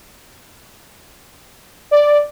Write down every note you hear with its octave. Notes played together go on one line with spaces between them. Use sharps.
D5